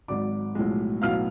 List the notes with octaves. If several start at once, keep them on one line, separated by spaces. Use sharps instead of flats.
G#1 G#2 F#3 D5 D6
B1 A2 F3 G#3
B1 A2 F#3 B3 F5 F6